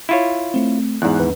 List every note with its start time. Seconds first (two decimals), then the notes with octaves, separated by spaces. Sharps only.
0.09 E4 F4 C#5
0.54 A3 C4
1.02 E2 G#2 D5 F#6
1.19 D#2 B4